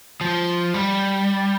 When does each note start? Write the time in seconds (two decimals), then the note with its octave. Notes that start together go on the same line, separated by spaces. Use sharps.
0.21 F3
0.74 G3